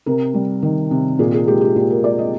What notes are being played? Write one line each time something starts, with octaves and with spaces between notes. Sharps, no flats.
C3 A#4
G3
D#3
C3
A#2 G#4
G#4
G#3 G4
G4
A#2 G4
A#4
G#3 D5
D#5